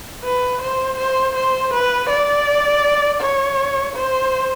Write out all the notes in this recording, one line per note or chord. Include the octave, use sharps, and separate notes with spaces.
B4
C5
C5
C5
B4
D5
C#5
C5